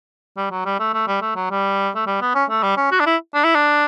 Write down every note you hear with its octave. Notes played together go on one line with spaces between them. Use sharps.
G3
F#3
G3
A3
A3
G3
A3
F#3
G3
A3
G3
B3
C#4
A3
G3
C#4
F#4
D4
E4
D4
E4
D4